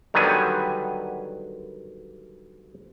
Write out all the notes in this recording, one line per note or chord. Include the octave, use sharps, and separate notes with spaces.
D3 D#3 F#3 G3 B3 G#5